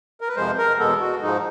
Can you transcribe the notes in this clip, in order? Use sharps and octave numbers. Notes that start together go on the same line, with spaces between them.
A#4
B4
F2 C3 F3 G#3 C5
A#4
E2 B2 G#3 B3 A4
F#4
G#2 F3 G#3 D#4